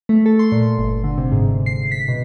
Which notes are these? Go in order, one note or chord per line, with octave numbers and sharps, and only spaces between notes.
A3
A4
C6
A#2
G1
D3
C3
G#2
C7
B6
B2